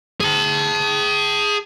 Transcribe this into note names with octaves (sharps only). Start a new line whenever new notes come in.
G#4 A5